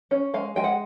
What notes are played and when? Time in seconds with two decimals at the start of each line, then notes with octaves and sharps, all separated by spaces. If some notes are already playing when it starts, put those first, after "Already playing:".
0.11 C#4
0.34 G#3 F5
0.56 G#3 G5
0.64 F#5